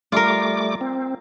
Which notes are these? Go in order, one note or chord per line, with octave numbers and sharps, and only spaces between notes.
G3 A3 F4 A#4 D6
C4